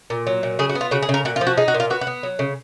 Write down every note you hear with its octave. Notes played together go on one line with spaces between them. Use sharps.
A#2
F#3
A#2
C#3 G#4
F#4
B3
F4
C#3 F#4
G#4
C#3
A#4
A#2 F#4
F4
F3
F#4
D#4 G#4
F#4
A#2
F4
B3 F#4
F#4
B3
F#3
C#3